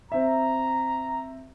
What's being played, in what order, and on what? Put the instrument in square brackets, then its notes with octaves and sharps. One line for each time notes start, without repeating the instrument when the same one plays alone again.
[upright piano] C4 E5 [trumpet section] A#5